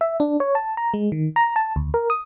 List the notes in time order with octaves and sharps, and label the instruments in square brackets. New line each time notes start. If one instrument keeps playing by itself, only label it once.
[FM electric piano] E5
D4
C#5
A5
A#5
G#3
D#3
A#5
A5
D2
A#4
D#6